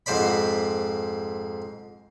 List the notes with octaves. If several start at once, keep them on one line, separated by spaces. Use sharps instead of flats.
F2 G#2 C5 D5 B5